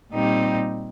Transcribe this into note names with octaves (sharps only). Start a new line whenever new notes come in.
A#2 G3 C4 D#4 G4